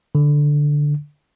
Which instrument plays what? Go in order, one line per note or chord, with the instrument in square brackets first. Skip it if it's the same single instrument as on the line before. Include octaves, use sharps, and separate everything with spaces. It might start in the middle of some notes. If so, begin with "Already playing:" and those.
[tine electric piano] D3